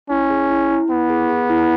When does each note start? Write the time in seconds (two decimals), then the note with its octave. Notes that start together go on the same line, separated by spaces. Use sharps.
0.10 C#4 E4
0.30 G#4
0.50 E4
0.70 E4
0.90 B3 E4
1.10 G#4
1.30 G#4
1.50 E4